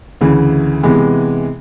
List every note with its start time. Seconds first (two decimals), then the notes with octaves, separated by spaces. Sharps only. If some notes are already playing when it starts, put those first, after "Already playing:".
0.21 D2 C#3 E3
0.83 C3 E3 G#3 B3